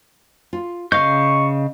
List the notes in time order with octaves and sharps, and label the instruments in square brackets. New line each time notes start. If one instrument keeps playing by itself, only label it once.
[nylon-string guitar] F4
[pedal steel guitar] C#3 F5 G6 [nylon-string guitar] D#5 [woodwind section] C#6